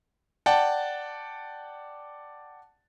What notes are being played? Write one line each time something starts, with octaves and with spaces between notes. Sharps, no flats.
D5 F#5 G5 A5